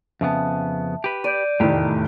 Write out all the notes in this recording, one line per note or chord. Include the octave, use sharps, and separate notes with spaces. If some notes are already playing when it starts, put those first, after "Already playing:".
F2 C#3 B3 E5 A5
G4 B4
D5 G6 D7 D#7
F1 E2 A2 D#3 G4